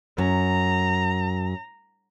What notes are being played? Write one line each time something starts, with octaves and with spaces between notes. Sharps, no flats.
F#2 A#5